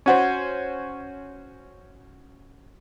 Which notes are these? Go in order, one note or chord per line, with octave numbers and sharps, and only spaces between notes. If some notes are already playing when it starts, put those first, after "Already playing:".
C#4 F#4 C5